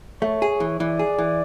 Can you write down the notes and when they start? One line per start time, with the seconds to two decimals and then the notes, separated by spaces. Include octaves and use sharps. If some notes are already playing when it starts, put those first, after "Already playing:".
0.22 A3 C#5
0.42 G#4
0.60 E3
0.80 E3 D5
0.99 G#4
1.18 E3